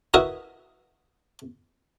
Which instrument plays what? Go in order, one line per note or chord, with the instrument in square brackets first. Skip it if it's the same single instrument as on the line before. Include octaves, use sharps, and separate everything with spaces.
[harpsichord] E4 F#4 A#4 B4 D#5 E5